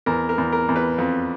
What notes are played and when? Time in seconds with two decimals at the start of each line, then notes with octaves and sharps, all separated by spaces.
0.06 E2 A#4
0.29 A#4
0.38 E2
0.52 A#4
0.69 E2
0.76 B4
0.98 F2